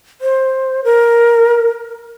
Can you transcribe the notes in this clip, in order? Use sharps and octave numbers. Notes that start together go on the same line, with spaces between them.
C5
A#4